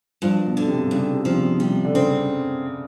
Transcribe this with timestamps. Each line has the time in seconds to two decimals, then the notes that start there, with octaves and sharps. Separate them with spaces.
0.22 G2 F3
0.46 B2
0.57 D3
0.68 C3
0.91 G2 C#3
1.14 C3
1.25 C3 F3
1.38 B2
1.60 C3 G3
1.85 D3
1.94 C#3 C4